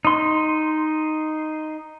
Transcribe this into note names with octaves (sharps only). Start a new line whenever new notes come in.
D#4 C6